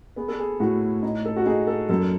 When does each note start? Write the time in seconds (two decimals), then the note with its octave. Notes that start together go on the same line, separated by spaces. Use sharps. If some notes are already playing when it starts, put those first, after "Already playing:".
0.16 B3 G#4
0.28 A4
0.40 G#4
0.60 A2 F#4
1.03 D#4
1.25 A4
1.36 F#4
1.46 D#4 G#4
1.67 A4
1.89 F#2 A4